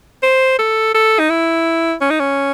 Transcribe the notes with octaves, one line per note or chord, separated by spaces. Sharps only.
C5
A4
A4
D#4
E4
C#4
D#4
C#4